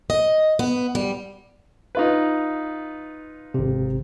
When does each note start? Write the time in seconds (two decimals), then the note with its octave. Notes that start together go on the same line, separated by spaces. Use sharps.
0.10 D#5
0.59 B3
0.95 G3
1.95 D#4 F4 B4
3.54 G#1 C3